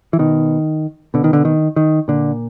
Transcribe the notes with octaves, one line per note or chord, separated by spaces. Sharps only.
E3
B2 D#3
B2 D3
D#3
D3
D#3
D#3
A#2 D3